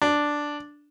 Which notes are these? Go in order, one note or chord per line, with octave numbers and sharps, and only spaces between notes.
D4